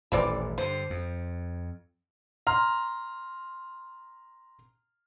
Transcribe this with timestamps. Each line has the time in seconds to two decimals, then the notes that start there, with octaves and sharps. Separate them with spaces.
0.12 D#1 A1 E3 C4 D5
0.58 G2 D3 C5
0.90 F2
2.47 A#5 C6 F6